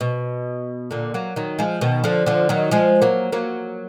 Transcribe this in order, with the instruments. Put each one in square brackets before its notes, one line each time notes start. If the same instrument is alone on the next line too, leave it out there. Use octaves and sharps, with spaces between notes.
[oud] B2
A#2 D3
F#3 A#3
D#3 F#3
F3 G#3
B2 D#3
D3 F3
D3 F3
D#3 F#3
F3 G#3
F#3 A#3
F#3 A#3